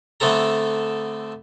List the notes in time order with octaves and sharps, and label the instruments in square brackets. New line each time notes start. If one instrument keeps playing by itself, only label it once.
[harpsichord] D3 A3 B3 C4 A4 A#5